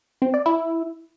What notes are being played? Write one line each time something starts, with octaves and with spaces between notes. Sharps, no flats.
C4
D5
E4